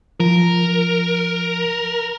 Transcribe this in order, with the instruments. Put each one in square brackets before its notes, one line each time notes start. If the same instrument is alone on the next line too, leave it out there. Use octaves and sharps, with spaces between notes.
[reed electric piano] F3 [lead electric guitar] A#4